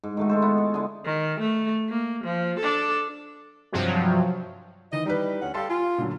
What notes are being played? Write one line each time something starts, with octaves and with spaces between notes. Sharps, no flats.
G#2
D#3 A3 F#4
G#3 A4 C5
B3 E4 F4
C#6
D3 G#3 D#5
D#3
A3
A#3
F3
D4 A4
G2 C3 F3 F#3
D#3 E3 D#5
G3 D#4 E4 B4
D2 C#4 F#5
G3 A4 F5 A5 C6
F4 G#5
A#2 D3 F#3